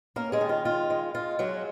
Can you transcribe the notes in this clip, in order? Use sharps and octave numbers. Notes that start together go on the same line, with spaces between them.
A#3 C#4 A#4
G#3 G#4
D#3
F4
G#3 F4
G#3
G#3 F4
F#3 G#3 F#4